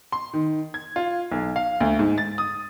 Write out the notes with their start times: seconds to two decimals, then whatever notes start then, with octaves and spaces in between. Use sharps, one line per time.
0.12 C6
0.33 D#3
0.74 G#6
0.96 F4
1.32 B1
1.56 F5
1.80 D2
1.99 G#2
2.18 A6
2.38 D#6